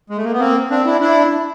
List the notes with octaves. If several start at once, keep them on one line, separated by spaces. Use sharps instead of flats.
G#3
A3
A#3
B3
A#3 C4
C4 D4
D4 E4
D4 E4